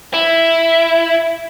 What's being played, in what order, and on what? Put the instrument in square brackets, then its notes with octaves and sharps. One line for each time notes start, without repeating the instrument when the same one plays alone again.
[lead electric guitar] E4